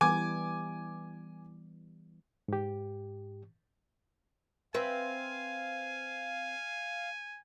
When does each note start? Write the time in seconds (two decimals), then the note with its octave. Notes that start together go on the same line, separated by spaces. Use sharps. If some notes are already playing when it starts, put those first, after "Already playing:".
0.01 E3 G3 B3 G#5 D6
2.48 G#2 G4
4.74 C4 B4 E5 F5 G#5